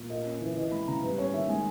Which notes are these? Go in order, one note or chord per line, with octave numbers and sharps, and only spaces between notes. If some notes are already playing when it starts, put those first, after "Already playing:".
Already playing: A#2
A#3 D#5
C#4
E3
E3 D#5
G#3 B5
C#3 A#5
G3 B4
C#4 C#5
D#3 E5
G#3 G#5